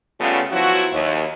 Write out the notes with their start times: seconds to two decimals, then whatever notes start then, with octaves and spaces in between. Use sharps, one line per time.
0.20 C#3 G3 A3 B3 C#4 F4
0.51 F3 F#3 B3 E4 F#4
0.91 D#2